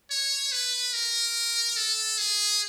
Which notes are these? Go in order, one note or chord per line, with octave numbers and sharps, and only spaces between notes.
C#5
B4
A#4
A4
G#4